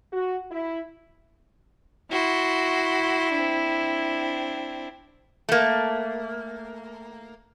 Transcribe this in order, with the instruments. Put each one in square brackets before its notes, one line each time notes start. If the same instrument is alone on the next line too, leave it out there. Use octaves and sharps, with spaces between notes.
[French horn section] F#4
E4
[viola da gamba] E4 [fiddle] F#4 C6
[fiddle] C4 D4
[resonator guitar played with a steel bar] A3 A#3